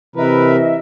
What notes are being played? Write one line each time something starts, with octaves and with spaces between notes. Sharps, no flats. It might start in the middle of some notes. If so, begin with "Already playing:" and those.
C3 E3 A#4 B4 D#5 E5